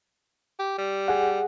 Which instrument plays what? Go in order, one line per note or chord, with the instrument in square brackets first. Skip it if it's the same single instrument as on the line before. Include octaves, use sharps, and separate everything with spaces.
[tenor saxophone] G4
G3
[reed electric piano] G#4 F#5